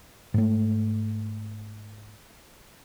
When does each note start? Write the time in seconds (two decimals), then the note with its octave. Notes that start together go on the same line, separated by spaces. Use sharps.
0.34 G#2 A3